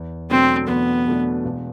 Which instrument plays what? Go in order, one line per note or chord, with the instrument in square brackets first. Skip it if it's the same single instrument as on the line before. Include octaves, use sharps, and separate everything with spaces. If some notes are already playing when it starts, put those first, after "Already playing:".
Already playing: [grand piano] E2
[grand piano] B2 F#3 A3 D4 [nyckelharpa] C4
[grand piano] E2 [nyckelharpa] B3
[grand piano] B2 F#3 A3 D4
E1